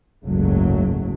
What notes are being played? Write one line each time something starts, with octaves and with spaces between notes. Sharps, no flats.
F#1 C#2 G#2 F#3 A3